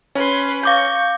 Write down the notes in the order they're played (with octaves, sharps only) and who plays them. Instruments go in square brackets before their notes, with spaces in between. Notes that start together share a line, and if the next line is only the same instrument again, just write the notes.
[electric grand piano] C#4 [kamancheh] B4 C6
[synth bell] F5 D6 G6 [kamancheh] C#6